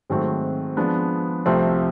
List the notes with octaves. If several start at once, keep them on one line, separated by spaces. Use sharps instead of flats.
G#2 D#3 F#3 A3 C4
F3 G#3 B3 D4
C2 C3 F3 A3 C4